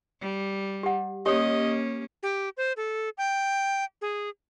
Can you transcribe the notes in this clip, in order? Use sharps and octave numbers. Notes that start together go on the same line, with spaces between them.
G3
G4 F#5
A#3 C#4 G4 C#5 D#5 D#6
G4
C5
A4
G5
G#4